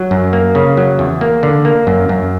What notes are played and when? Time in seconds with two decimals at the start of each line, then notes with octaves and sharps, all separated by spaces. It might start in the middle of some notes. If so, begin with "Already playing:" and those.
Already playing: F#3
0.11 F#2
0.33 A#3
0.55 C#3
0.77 F#3
0.99 E2
1.21 A#3
1.43 D3
1.65 A#3
1.87 F#2
2.09 F#2